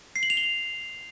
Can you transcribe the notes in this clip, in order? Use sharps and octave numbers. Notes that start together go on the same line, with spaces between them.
C7
F#7
F7
G7